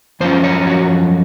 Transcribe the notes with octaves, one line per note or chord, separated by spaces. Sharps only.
F#2 F3 C#4 F4 C5
C#5
F#4